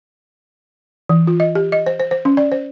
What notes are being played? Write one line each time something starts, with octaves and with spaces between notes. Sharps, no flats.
E3
F4
D#5
G4
D#5
C5
C5
C5
C#4
D5
C5